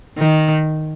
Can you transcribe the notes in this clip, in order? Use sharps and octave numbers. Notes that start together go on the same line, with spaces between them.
D#3